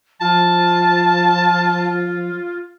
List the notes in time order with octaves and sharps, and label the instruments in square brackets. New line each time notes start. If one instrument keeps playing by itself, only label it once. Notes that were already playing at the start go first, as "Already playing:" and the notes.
[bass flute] F3 [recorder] F4 [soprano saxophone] A5